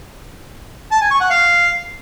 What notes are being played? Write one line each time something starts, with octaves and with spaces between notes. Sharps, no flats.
A5
G#5
C#6
F#5
F5